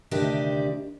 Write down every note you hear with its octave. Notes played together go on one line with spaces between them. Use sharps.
D2 C3 D#3 D4 G4